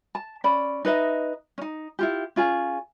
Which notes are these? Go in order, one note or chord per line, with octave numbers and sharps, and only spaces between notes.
A5
C#4 D5 B5
D#4 B4 D#5 E5
C#4 D#4
E4 F4 G4
C#4 F4 G#4